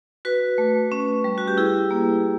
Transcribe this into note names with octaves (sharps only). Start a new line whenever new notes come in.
F#4 B4
A3
C#4
G3
F#4
G4
E4 G#4
A#3